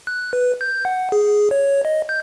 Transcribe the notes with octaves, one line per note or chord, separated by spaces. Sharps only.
F#6
B4
G6
F#5
G#4
C#5
D#5
G6